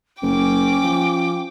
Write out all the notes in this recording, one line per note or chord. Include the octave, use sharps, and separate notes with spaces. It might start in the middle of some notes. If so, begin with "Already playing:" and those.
F#1 C#4 G5 D6
F3